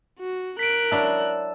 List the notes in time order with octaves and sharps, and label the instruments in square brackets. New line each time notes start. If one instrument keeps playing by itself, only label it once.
[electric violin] F#4
[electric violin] A#4 F#6 [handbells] B6 D7
[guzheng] F#3 D4 E4 [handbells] A5 E6